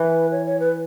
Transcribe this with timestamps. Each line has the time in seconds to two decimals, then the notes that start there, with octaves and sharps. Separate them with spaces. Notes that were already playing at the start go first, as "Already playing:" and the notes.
Already playing: E3 B4
0.32 C#5
0.46 C#5
0.60 B4